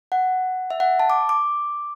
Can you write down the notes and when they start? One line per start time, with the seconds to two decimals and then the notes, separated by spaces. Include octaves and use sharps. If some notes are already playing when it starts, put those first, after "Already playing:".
0.12 F#5
0.70 E5
0.80 F#5
1.00 A5
1.10 D6
1.29 D6